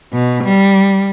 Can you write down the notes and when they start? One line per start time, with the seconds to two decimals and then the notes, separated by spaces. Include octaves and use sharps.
0.13 B2
0.44 G3